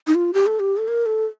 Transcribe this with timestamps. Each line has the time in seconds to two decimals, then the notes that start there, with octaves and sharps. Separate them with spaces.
0.07 D#4
0.15 F4
0.34 G4
0.47 A4
0.60 G4
0.77 A4
0.88 A#4
1.06 A4